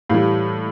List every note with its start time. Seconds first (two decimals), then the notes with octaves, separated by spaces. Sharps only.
0.10 A2 E3 G3 F5